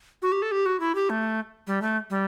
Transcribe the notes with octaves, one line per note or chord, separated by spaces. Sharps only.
F#4
G4
A4
G4
F#4
E4
G4
A3
G3
A3
G3